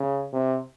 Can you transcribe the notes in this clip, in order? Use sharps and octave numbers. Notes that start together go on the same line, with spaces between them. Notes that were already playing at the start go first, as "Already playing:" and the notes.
Already playing: C#3
C3